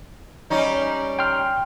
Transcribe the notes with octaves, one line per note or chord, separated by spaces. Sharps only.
G3 C#4 D#4
G5 C6 F6